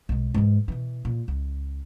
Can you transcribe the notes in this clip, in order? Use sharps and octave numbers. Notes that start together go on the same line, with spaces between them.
B1 G#3
G#2 E3
B2 E3
A#2
C#2